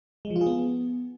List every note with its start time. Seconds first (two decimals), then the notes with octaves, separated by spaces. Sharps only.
0.25 G#3
0.30 F3
0.36 F4
0.41 G#4
0.47 B3